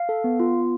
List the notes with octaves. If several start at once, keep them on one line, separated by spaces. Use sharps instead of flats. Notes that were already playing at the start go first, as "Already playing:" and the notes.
Already playing: F5
A4
B3
F4
B3